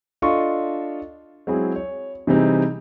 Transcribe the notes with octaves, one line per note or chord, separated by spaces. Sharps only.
D4 F4 A4 D#5 C6 C#6
F#3 G#3 C4 E4 G#4
C#5
C3 E3 G3 C4 D#4 G#4